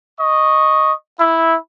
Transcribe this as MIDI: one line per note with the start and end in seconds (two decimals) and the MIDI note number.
0.21 0.94 75
0.21 0.94 85
1.19 1.57 64